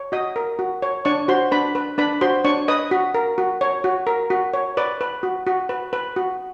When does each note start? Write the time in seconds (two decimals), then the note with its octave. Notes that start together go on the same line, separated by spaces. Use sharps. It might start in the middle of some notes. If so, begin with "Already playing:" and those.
Already playing: C#5
0.12 F#4 D#5 D#6
0.36 A#4
0.59 F#4
0.82 C#5
1.05 D4 C#5 C#6
1.28 F#4 C5 C6
1.52 D4 B4 B5
1.75 B4
1.98 D4 B4 B5
2.21 F#4 C5 C6
2.44 D4 C#5 C#6
2.68 B4 D#5 D#6
2.91 F#4
3.14 A#4
3.38 F#4
3.61 C#5
3.84 F#4
4.07 A#4
4.30 F#4
4.54 C#5
4.77 B4 D5 D6
5.01 B4
5.23 F#4
5.47 F#4
5.69 B4
5.93 B4
6.16 F#4